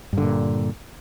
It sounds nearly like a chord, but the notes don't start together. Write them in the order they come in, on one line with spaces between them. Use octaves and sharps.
G2 D3 A#2